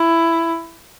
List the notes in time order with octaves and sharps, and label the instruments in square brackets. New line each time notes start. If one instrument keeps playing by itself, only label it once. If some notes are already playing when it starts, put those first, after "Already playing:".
Already playing: [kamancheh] E4